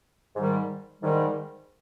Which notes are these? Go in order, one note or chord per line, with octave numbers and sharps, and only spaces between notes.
G#2 D#3 G3
G#2 D#3 G3